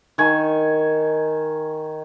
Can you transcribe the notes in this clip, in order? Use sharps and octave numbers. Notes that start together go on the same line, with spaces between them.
D#3 G#5 C#6